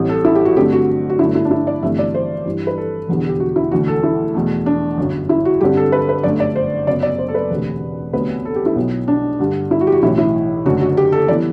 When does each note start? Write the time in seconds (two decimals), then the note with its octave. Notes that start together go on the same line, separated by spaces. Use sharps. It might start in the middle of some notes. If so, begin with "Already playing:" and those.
Already playing: A1 A2 G3 C4
0.09 A4
0.25 E4
0.35 G4
0.45 F#4
0.56 G2 D3 A3 C4 G4
0.72 F#4
1.09 F#4
1.19 G1 G2 F#3 A3 E4
1.35 E4
1.45 D4
1.51 E4
1.67 D5
1.83 G1 G2 E3 A3 C4 E5
1.98 D5
2.14 C5
2.45 G2 E3 G3
2.67 B4
2.78 A4
3.08 E1 E2 D3 G3 B3
3.29 G4
3.40 F#4
3.56 E4
3.71 E1 D2 D3 F#4
3.88 A4
4.03 E4
4.34 E2 B2 A3
4.66 D4
4.98 G1 F#2 F#3
5.29 E4
5.45 F#4
5.61 G2 D3 G3 C4 G4
5.77 A4
5.92 B4
6.09 B4
6.23 G1 F#2 D3 A3 D5
6.40 D5
6.55 C5
6.87 F#1 F#2 F#3 B3 D5
7.03 D5
7.18 C5
7.28 A4
7.35 B4
7.51 E1 D2 C3
8.13 D2 C3 F#3 B3 B4
8.45 A4
8.56 G4
8.66 E4
8.76 B1 B2 F#3 B3
9.08 D4
9.40 G2 D3 G3
9.71 E4
9.81 F#4
9.87 G4
9.92 F#4
10.02 B1 A2 E3 E4
10.18 E4
10.66 F#1 F#2 D3 A3 F#4
10.81 F#4
10.97 G4
11.12 A4
11.28 E3 G3 B3 D5